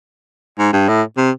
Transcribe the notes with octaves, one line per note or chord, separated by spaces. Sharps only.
G#2
G2
A2
C3